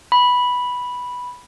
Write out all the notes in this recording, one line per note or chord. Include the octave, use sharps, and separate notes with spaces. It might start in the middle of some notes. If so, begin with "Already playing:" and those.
B5